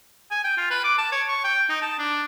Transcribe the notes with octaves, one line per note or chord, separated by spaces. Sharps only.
G#5
G5
F4
B4
D6
A5
C#5
C#6
G5
D#4
A5
D4